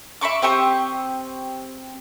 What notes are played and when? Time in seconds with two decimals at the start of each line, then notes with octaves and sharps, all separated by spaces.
0.21 E5 B5 C#6 D6
0.42 C4 G4 C#6 D#6